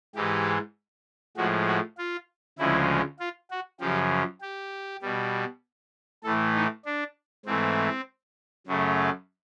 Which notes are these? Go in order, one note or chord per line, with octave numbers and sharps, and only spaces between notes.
G#2 E3 G#3 G4
A2 F3 G#3 F#4
F#4
F4
D2 C#3 F3 G#3 E4
F4
F#4
F#2 C#3 F3 G4
G4
B2 G3
A2 E3 A3 A4
D#4
D4
G#2 E3 A3 C4
F#2 C#3 F#3 A3